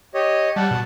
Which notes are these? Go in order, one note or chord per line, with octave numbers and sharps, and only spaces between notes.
G4 C#5 D#5
G3 F#5 A5
B2